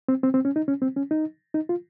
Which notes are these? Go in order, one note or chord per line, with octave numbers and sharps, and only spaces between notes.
C4
C4
C4
C#4
D#4
C#4
C4
C#4
D#4
D#4
F4